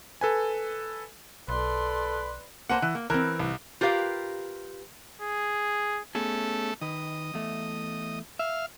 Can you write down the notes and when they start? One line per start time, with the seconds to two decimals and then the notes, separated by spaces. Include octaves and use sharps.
0.21 A4 B4 G#5
1.48 B1 A4 B4 D5 C6
2.69 A#3 B4 C5 F#5
2.82 E3
2.95 A#3
3.10 E3 C4 A#4
3.39 C2
3.81 F4 G4 A#4 B4 F5
5.21 G#4
6.15 A3 B3 C#4 G#4 A4
6.81 D#3 B4 D#5
7.34 E2 A3
8.39 E5 F5